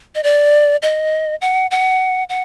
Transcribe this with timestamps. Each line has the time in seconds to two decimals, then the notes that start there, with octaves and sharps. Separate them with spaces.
0.15 D#5
0.23 D5
0.82 D#5
1.41 F#5
1.71 F#5
2.29 F#5